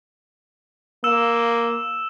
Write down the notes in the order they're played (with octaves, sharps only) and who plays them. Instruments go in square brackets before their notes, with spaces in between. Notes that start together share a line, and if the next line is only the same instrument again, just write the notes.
[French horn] A#3 [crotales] E6 E7